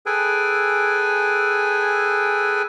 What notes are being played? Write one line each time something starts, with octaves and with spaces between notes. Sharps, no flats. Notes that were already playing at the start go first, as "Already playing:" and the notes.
G#4 A4 B4 G5 G#5